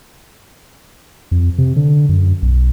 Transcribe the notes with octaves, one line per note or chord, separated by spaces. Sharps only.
F2
C3
D3
F#2
B1